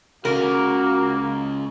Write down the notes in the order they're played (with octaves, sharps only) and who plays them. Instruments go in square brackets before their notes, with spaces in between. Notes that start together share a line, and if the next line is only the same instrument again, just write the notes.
[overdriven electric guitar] C#2 C#3 [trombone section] A#3 [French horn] F#4 [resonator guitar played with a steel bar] A#4